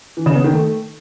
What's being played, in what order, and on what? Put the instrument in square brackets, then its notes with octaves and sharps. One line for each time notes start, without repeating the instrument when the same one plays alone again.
[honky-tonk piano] E3
C#3
B3
D#3
A3